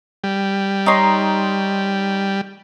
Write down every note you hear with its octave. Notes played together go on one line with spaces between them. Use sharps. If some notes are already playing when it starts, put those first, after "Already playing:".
G3
D#4 C#5 C6